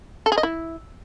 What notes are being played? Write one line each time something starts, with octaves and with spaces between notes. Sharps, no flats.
A4
G#4
D#5
E4